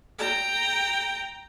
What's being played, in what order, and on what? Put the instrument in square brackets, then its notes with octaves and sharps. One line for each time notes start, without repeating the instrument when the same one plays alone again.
[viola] G5 A#5